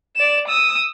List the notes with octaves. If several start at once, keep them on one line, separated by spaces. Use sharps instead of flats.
D5 E7
D#6 E6